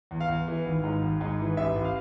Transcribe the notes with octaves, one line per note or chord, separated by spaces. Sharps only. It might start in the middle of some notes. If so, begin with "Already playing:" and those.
E2
F5
E2
E3
G#1
G#2
G#1
G#2
E3
A1 E5
A1
F5